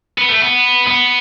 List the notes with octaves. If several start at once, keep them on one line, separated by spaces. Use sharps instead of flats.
B3
A3
B3
B3